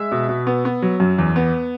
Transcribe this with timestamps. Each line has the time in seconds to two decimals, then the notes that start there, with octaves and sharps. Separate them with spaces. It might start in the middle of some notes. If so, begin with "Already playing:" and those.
Already playing: G#3 E5 E6
0.12 B2
0.29 B2
0.47 B3
0.65 B3
0.82 F#3
1.00 F#2
1.18 E2
1.36 B3